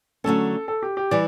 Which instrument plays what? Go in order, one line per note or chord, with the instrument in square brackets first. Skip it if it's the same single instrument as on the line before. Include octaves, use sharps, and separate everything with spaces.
[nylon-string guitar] D3 F#3 A3 C#4 [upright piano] A4
[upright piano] A4
G4
G4
[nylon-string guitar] E3 G3 [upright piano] D5